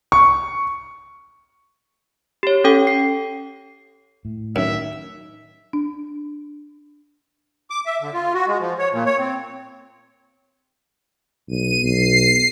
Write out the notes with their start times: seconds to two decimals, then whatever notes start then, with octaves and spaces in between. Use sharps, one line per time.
0.12 C#6
2.43 G4 C#5
2.64 C#4 A4 G5
2.87 C7
4.25 A2
4.56 F#2 D#3 E5
5.73 D4
7.70 D6
7.86 E5
8.02 D3
8.13 F4
8.34 F#4
8.47 G#3
8.60 F3
8.78 C#5
8.92 A#2
9.05 C#5
9.19 C4
11.49 B1 D#7
11.83 B1 C7